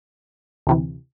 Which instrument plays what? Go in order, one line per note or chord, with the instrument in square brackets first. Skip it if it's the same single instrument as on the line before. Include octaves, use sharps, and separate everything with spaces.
[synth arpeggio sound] D2 C3 E3